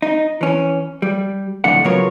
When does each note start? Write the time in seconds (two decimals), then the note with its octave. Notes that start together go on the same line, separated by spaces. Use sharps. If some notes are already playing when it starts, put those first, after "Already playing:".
0.02 D#4
0.41 E3 C#4
1.02 G3
1.64 B1 F2 A2 D3 A3 F#5
1.84 C#3 F#3 B3 F4 A#4 C#5